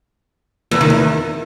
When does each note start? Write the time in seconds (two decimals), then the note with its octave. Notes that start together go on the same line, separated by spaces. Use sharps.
0.71 E2
0.81 D#3
0.90 E2